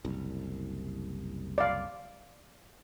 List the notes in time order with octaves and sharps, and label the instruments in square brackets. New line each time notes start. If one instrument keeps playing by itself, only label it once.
[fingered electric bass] F#1 C2
[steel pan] D5 F5